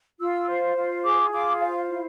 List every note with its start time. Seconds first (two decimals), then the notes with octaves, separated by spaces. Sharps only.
0.20 F4 E6
0.48 C5
0.76 F4
1.05 G#4 D6
1.33 F4 D6
1.60 C5 F5
1.89 E4